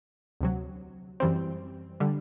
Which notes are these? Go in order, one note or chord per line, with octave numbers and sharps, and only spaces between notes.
D2 C3 F#3
F#2 E3 G3 C4
D3 G3